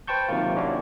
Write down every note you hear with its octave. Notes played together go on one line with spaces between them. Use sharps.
B4 C5 G5 A5 C#6 G6
C3 D#3 F#3 A#3 F4
A#3 C#4 D4 E4 F#4